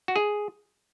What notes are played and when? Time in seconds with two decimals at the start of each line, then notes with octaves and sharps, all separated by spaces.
0.08 F#4
0.16 G#4